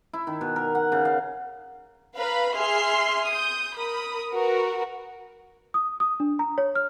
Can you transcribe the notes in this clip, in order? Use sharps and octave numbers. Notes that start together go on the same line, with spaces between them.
E4
D#3
B2
A#4
F#5
C#3
F5
B4 F5 A#5 B5
G#4 E5 C6 F6 C7
D#6 G6
A#4 B5 D#6
F#4 A#4 B4
D#6
D#6
D4
A#5
C#5
F6